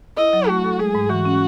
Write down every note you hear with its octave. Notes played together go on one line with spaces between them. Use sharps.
E4 D#5
F#3
A3 F#4
A4
G#3 G#4
G#2
E3 F#4
C#4